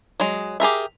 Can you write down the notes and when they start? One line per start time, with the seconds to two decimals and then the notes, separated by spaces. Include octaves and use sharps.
0.20 F#3 G#3
0.60 G4 G#4 A#4 E5